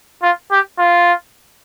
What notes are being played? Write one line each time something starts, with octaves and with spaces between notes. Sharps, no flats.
F4
G4
F4